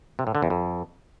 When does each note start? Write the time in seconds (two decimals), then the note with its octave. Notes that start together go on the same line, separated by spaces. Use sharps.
0.19 C3
0.27 A2
0.35 D3
0.42 E2
0.50 F2